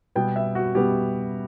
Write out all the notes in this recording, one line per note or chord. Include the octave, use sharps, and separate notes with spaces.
B2 G3 B3 G5
E5
F#4
B2 G3 B3 G4